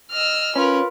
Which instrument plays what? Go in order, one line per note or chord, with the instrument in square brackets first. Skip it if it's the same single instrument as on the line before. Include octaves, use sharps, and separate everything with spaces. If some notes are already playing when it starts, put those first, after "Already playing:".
[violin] D#5 E6 [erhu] F6
[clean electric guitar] C#4 [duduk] F4 [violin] A#4 B4